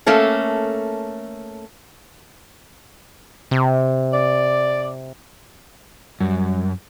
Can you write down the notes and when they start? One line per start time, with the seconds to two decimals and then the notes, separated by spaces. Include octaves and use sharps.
0.06 A3 A#3 C#4 A4
3.51 C3
4.13 D5
6.21 F#2 G3